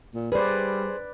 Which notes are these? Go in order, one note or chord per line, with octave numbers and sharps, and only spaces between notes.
A#2
G3 G#4 B4 C5 D5